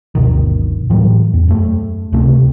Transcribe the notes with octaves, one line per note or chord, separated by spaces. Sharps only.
G1 D2 B2 D#3
A2 E3 F#3 G3
E2
F#2 A3
C#2 C3 A3 C4